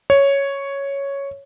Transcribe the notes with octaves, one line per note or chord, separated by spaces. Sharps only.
C#5